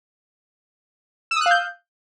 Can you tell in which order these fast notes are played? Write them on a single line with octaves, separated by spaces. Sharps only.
E6 D#6 F#6 F5 G6